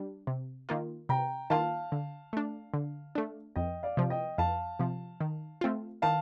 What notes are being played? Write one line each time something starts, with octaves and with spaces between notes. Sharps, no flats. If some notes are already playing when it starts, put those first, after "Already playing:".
Already playing: G3 D4
C3
D#3 A#3 F4
C3 G5 A#5
D#3 A#3 F4 F5 A5
D3
A3 D4
D3
A3 D4
F2 D#5 G5
D5 F5
C3 F3
D#5 G5
F2 F5 A5
C3 F3
D#3
A3 C4 F4
D#3 F5 A5